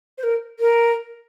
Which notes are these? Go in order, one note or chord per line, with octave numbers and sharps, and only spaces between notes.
C5
A#4
A#4